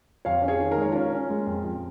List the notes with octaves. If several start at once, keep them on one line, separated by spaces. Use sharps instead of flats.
F2 C#5 F5
C#4
G#4 C#5
D#3
A#4
G#3 C#5
C#4 F4 A#4
C#4
G#3
F2
F2